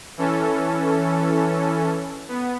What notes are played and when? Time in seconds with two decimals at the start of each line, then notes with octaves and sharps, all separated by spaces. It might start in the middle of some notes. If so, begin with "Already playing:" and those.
0.17 E3 C#4 A4
2.28 B3